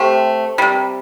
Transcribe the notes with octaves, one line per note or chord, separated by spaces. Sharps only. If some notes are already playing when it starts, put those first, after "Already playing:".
Already playing: C3 A3 G4 C5
C3 G3